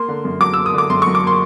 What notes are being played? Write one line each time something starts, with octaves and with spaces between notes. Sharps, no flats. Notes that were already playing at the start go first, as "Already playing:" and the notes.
Already playing: A#3 C6
D3
F#2
F#3 D6
A#3 E6
D#6
D3 D6
F#2 C6
C#6
F#3
D6
A#3 C6